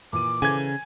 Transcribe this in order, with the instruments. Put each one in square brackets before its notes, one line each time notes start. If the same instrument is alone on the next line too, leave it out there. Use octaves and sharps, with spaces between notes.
[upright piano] A#2 E3 D#7 [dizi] D6
[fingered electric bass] C#3 [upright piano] E3 A4 C5 [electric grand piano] G#5 G#6